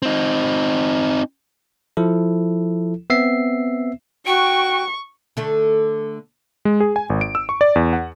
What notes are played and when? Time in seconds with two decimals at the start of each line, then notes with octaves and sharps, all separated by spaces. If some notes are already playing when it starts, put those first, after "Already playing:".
0.02 C4 D#4
1.97 F3 E4 A4
3.10 B3 C4 E5 C7
4.26 F#4 G5 C#6
5.37 D3 A3
6.65 G#3
6.80 G#4
6.96 G#5
7.10 G#1
7.21 D7
7.35 E6
7.49 C#6
7.61 D5
7.76 E2
7.93 F#5